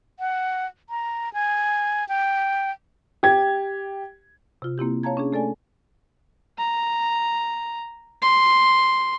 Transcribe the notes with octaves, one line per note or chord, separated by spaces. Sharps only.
F#5
A#5
G#5
G5
G4 G#6
C3 F4
A#3 C4 E4 G4
C#5 F5 A5 A#5 G#6
C#4 D4 G#4
A3 A4 D5 G#5
A#5
C6